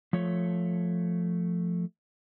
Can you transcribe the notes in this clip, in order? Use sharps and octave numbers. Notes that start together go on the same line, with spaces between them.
F3 A3 C#5